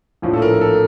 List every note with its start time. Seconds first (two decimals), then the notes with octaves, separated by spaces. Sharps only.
0.22 A#1 A2 F3
0.33 A4
0.42 A#4
0.61 A4